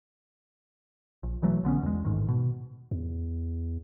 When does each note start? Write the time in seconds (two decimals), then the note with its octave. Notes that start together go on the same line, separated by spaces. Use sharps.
1.23 A#1
1.42 B2 E3 F#3 A3
1.63 A#1 D3 B3 C#4
1.83 E2 G#3
2.04 A1 G#2 D#3
2.28 B2
2.91 E2